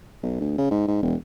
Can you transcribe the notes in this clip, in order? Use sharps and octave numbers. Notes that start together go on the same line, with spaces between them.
B1
D2
C#3
G#2
G#2
E1